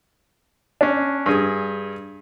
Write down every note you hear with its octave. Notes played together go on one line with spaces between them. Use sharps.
C#4 D4
G2 G#4